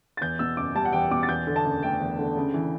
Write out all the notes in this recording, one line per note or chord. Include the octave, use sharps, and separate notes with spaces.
A6
E2 G6
B2 E6
F#1 D6
G3 A5
F#5
E2 G5
B2 D6
A6
E2 G6
D3
A5
F#1
A3 G5
E2
D3
C#3
E3